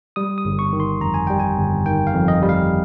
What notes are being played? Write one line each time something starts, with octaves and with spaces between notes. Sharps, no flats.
G3 D#6
D#6
G1
C#6
D#3
C6
F2 A#5
G#5
G3 G5
G#5
G1
D#3 G5
F5
F2
D#5
G3
F5